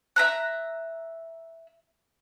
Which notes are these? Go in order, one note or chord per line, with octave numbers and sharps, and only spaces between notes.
E5 A#5 F#6